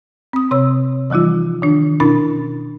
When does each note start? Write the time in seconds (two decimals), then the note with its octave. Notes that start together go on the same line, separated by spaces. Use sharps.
0.33 C4 D#6
0.51 C3 C#5 E6
1.10 E3 F3 G3 D#4 F4
1.62 D#3 D4
2.00 B2 C#4 D4 E4 B5 A6